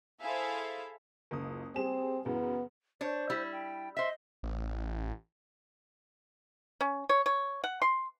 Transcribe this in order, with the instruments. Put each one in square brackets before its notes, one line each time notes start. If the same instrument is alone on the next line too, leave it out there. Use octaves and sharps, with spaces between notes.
[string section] E4 G#4 A4 C5 E5 F5
[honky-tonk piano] F#1 C#2 D#6
[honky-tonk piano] G3 G#4 E7 [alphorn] C4
[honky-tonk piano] F#2 C#3 E3 [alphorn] B3
[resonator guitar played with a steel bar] D4 C#5 [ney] C5
[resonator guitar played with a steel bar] G3 E4
[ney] G5
[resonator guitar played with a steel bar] C5 E5 [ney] D#5
[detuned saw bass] A1
[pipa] C#4
C#5
C#5
F#5
C6